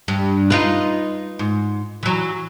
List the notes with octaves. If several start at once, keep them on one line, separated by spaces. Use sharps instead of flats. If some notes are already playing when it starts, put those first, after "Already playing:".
G2
D#4 F4 B4
G#2
E3 F#3